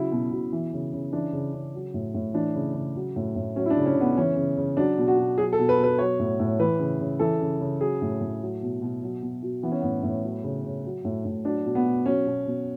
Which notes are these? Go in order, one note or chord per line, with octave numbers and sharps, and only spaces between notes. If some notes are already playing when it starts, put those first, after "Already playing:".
Already playing: C#3 F#3 E4
B2
B2
E3
C#3
C#3
E3 D4
C#3
C#3
F#3
A2
A2
E3 D4
C#3
C#3
F#3
A2
A2
F#3 C#4
E4
D4
C#3
C#4
C#3
B3
E3 C#4
C#3
C#3
F#3 D4
B2
F#4
B2
F#3 G#4
A4
B2
B4
B2
B4
F#3 C#5
A2
A2
E3 B4
C#3
C#3
E3 A4
C#3
C#3
F#3 G#4
A2
A2
F#3
B2
B2
F#3
B2
B2
E3 B3
C#4
A2 B3
A2
F#3
C#3
C#3
F#3
A2
A2
F#3 D4
B2
B3
B2
F#3 C#4
B2
B2